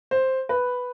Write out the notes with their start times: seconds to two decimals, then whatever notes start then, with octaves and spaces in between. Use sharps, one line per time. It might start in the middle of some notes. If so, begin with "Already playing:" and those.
0.11 C5
0.49 B4